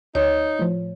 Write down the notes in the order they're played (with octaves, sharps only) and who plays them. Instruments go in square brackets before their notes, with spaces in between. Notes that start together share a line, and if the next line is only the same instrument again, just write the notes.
[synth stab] D2 [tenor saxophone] D#4 [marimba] C#5
[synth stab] A2 F3